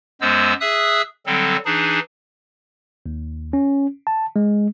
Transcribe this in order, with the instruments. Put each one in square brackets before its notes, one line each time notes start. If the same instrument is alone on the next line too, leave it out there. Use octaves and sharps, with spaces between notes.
[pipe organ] F#2 G#3 B3 C5 E6
G#4 E5 D#6 E6 F#6
D3 F#3 G3 C4 A4
E3 D4 D#4 G#4
[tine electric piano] D#2
C#4
A5
G#3